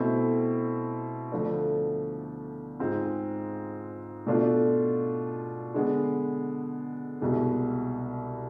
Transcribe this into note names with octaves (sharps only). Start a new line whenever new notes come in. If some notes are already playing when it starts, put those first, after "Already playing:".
Already playing: B2 A3 C4 E4
D2 D3 F3 A3 D4
G#2 G#3 C4 F4
B2 A3 D4 F4
D3 G#3 B3
C2 B2 G#3